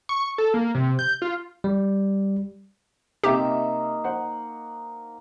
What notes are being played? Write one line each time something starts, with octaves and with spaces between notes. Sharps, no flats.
C#6
A4
A#3
C3
G6
F4
G3
C3 A#3 D#4 G4 E5
C5 F#5